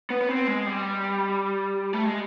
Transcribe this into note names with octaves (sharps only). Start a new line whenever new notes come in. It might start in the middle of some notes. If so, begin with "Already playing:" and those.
B3
B3
C4
G#3
G3
A3
G#3